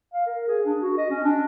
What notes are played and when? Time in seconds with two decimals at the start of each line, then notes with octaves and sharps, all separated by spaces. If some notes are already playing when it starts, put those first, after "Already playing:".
0.13 F5
0.26 A#4
0.48 G#4
0.66 D4
0.80 F#4
0.97 D#5
1.10 C#4
1.24 D4